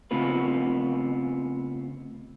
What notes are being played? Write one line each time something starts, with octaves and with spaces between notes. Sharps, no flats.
C#3 A3 B3 C4 F4 B4